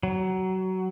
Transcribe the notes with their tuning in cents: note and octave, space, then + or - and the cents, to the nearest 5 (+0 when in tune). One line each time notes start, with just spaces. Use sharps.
F#3 +20